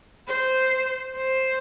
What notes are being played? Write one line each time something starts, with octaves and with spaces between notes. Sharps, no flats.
C5
C5